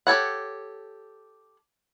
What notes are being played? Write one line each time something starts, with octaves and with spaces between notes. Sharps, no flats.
G4 A4 C#5 F#5